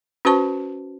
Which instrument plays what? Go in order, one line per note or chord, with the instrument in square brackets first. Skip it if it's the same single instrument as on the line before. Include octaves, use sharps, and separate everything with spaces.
[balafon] C#4 F#4 B4 C5 A5 C#6